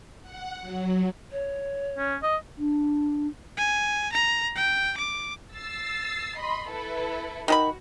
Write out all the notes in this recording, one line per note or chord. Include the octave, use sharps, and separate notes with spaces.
F#5
F#3
C#5
C#4
D#5
D4
G#5
A#5
G5
D6
E6 A6 C7
D#5 B5 C6
E4 A4 B4
D#3 F#4 G#4 B5